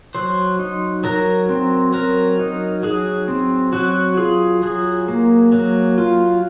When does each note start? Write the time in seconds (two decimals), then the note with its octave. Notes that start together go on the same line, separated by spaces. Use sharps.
0.15 F#3 C5
0.59 D#4
1.04 F#3 A#4
1.49 C4
1.93 F#3 A#4
2.39 D#4
2.83 F#3 G#4
3.28 C4
3.73 F#3 F#4
4.17 F4 G#4
4.63 F#3 G#4
5.08 A#3
5.52 F#3
5.98 F4